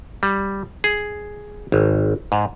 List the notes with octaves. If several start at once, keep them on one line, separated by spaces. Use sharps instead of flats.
G3
G#4
G#1
G#2